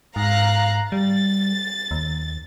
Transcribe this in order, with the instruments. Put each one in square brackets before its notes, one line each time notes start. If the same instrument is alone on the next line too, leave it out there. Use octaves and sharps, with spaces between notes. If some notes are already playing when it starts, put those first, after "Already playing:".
[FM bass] G#2 [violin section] F5 A#5 F#6
[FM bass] G3 [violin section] A6
[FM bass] D#2